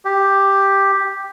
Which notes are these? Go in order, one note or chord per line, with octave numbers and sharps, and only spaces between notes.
G4